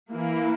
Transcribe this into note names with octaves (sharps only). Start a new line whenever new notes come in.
E3 A#3 E4